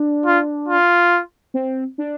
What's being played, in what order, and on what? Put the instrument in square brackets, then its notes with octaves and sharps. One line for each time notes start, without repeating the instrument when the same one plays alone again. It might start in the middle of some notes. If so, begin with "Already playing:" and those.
Already playing: [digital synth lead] D4
[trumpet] F4
F4
[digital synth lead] C4
D4